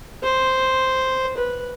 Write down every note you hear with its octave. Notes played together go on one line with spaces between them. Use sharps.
C5
B4